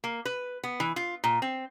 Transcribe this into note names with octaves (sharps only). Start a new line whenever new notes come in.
A#3
B4
B3
E3
F4
A#2
C4